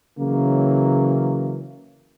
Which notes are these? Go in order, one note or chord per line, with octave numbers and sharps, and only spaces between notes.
C#3 E3 F#3 A#3